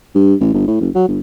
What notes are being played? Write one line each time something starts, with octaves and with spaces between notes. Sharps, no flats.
G2
A1
G1
A2
F#1
F#3
G1